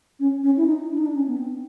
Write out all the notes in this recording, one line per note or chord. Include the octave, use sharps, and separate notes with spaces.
C#4
C#4
E4
D#4
D4
D#4
D4
C#4
B3
C4